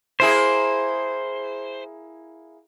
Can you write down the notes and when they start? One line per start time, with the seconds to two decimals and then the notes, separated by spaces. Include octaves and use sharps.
0.20 A#3 E4 G#4 C5